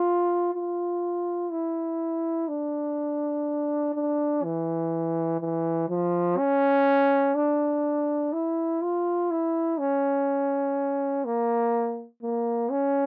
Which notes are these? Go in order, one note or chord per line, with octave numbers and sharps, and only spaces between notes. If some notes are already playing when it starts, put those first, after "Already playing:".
Already playing: F4
F4
E4
D4
D4
E3
E3
F3
C#4
D4
E4
F4
E4
C#4
A#3
A#3
C#4